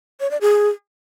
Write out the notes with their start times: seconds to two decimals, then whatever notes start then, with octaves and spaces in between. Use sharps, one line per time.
0.21 C#5
0.31 D5
0.41 G#4